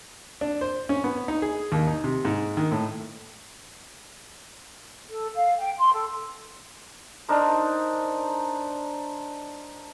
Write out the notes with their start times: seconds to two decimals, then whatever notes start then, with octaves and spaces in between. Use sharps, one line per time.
0.41 D4
0.61 C5
0.89 C#4
1.04 B3
1.28 D#4
1.42 G#4
1.72 D#2
1.87 D#4
2.04 C3
2.25 G#2
2.57 D#3
2.71 A2
5.10 A4
5.35 F5
5.58 G5
5.78 C6
5.93 A4
7.29 D4 D#4 A#4 C5